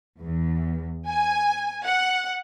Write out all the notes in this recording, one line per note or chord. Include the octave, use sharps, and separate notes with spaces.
E2
G#5
F#5